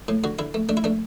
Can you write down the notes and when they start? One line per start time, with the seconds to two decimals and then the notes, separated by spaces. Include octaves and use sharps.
0.08 A2
0.24 D3 F#4
0.39 D3 E4
0.54 A3
0.69 A3 D4
0.77 E4
0.84 A3 D4